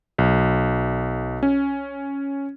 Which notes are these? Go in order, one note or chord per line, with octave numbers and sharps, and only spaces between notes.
B1
C#4